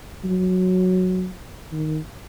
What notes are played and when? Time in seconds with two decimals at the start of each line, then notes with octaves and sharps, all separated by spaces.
0.24 F#3
1.72 D#3